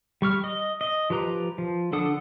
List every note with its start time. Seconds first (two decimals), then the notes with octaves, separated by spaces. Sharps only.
0.22 G3 C#6 F6
0.44 D#5
0.81 D#5
1.10 F3 G4 B4 A#5
1.58 F3
1.93 D3 D4 A4 F#5 D#6